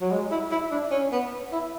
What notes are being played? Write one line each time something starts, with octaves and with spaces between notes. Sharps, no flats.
F#3
G#3
E4
E4
D4
C#4
B3
E4